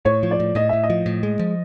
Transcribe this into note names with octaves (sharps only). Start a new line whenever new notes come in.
A2 C#5
F3
D5
A2
A2 D#5
A2 E5
D#5
F3
A2
G#3
F3